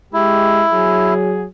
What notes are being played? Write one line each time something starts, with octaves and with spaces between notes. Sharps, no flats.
G#3 E4 G4
F#3 G#4